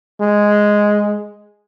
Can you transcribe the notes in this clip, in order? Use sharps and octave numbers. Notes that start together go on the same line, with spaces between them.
G#3